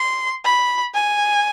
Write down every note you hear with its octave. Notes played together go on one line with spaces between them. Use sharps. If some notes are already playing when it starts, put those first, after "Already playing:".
Already playing: C6
B5
G#5